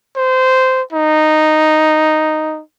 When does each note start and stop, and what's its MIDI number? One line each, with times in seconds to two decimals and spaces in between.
0.16 0.82 72
0.93 2.61 63